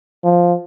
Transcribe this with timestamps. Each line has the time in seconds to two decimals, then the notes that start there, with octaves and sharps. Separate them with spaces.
0.24 F3